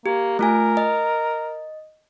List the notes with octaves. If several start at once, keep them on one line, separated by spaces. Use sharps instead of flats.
A#3 G4
A3 F4 A#4 G#5
D#5